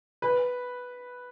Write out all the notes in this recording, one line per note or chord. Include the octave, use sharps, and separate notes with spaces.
B4